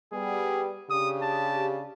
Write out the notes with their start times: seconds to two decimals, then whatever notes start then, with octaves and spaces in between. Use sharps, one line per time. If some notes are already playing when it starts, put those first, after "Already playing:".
0.13 G3 B3 G#4
0.90 C#3 D4 G4 D#6
1.23 A5